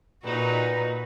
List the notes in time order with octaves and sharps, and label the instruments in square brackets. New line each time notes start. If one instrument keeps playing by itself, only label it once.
[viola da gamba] A#2 F#4 [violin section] D#4 B4